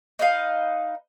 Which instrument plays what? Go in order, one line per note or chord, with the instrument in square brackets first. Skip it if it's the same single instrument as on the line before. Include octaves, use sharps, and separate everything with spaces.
[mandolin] D#4 B4 D#5 F5